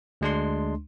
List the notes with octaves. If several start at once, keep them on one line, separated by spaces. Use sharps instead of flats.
D2 G#3 D4 C6